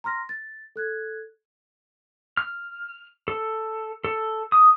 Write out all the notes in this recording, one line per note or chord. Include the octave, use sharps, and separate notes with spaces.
A#5 C6 F6 A#6
A6
A4 F#6 G#6
F6
A4
A4
D#6